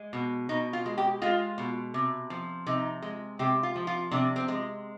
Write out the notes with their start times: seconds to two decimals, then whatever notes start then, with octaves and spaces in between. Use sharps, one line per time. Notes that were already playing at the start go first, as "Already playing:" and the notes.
Already playing: G#3
0.13 B2
0.49 B2 D#4
0.73 F4
0.86 G#3
0.98 G4
1.22 G#3 F4
1.58 B2
1.94 C3
2.30 F3
2.66 C3 D#4
3.02 G#3
3.39 C3 G4
3.63 F4
3.76 F3
3.87 F4
4.11 C3 D4
4.36 C4
4.48 G#3